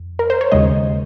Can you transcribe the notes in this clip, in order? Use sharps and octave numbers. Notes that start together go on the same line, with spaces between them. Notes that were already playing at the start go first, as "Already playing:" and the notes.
Already playing: F2
A#4
C5
C#5
D#2 C#3 G#3 D#5